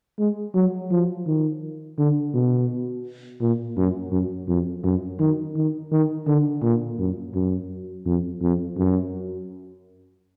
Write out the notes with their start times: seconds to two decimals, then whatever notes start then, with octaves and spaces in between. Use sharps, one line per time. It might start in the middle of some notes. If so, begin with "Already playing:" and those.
0.19 G#3
0.55 F#3
0.91 F3
1.27 D#3
1.98 D3
2.34 B2
3.41 A#2
3.77 F#2
4.12 F#2
4.48 F2
4.84 F#2
5.20 D#3
5.56 D#3
5.92 D#3
6.27 D3
6.63 A#2
6.99 F#2
7.35 F#2
8.06 F2
8.42 F2
8.77 F#2